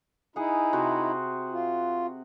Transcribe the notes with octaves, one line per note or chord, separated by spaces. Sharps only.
D#4 E4 G#4 F#5
C3 F#4 C5
F4